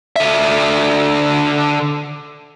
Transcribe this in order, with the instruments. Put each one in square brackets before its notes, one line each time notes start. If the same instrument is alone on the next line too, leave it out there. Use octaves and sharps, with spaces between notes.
[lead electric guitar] D3 E5